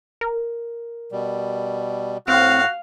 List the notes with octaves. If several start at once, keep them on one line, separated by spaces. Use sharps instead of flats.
A#4
B2 G3
A2 C4 F#4 F5